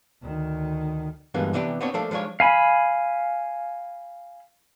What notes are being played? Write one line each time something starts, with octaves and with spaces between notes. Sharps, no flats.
D2 D#3
D2 G2 E3 G#3 A#3 B3
C3 E3 B3 D4 F#4 G4
B3 C4 D4 C#5
F3 A3 A#3 D4 A4
F3 G#3 D4 F4 C#5
F5 G#5 B5